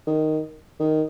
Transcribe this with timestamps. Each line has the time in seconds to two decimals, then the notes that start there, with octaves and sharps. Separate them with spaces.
0.07 D#3
0.80 D#3